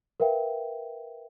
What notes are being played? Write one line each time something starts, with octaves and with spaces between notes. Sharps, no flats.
A#4 B4 E5 F5 G5